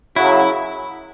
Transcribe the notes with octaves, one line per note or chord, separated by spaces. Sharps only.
F#2 C#3 F#3 E4